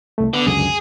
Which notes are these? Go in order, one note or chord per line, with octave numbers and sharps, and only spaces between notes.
C2 A3
D3 B3
C#2 F#2 D3 G#4